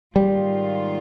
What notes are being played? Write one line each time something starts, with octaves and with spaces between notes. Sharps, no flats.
G#2 D#3 G3 A#3 F4